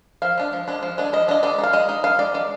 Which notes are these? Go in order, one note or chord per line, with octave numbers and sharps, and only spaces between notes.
F3 F5
G#3 D4
F3
G#3 D4
F3
G#3 D4
F3 D#5
G#3 D4 D#5
G#3 D5
D#4
F5
G#3 D#5
D#4
G#3 F5
D#4 D5
G#3 D5